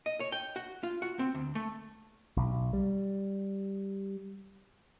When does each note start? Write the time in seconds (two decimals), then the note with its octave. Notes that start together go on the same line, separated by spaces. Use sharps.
0.06 D#5
0.20 C#5
0.32 G5
0.56 F#4
0.83 F4
1.02 F#4
1.19 C4
1.35 D2
1.55 A3
2.37 B1
2.73 G3